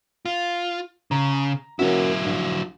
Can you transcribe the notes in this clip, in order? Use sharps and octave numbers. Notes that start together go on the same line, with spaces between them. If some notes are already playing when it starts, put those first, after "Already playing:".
F4
C#3 A#5
F#3 A#3 C#4 E4 F#4
A#1